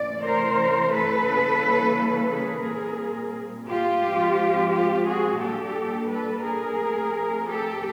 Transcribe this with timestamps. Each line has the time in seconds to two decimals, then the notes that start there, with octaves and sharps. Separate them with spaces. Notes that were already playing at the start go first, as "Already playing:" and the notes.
Already playing: C3 E3 A3 C#4 D5
0.25 A#4 C5
0.93 A4 B4
1.28 C#3 E3 G3 A#3 C#4
2.31 G#4 A#4
2.66 A#2 G3 C4
3.69 F4 G4
4.03 F3 G#3 C4
4.72 F4 G4
5.06 F#4 G#4
5.41 A#2 G3 A#3 D4 G4 A4
6.10 A4 B4
6.44 G#4 A#4
6.80 F3 A3 C4
7.48 G4 A4